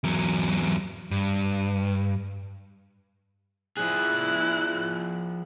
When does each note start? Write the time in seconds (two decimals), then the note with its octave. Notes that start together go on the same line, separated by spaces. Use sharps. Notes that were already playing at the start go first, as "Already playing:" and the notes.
0.04 E2 F#3
1.11 G2
3.77 F3 E4 G#4 F#6